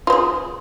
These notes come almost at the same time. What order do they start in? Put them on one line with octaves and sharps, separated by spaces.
F4 C5 G#4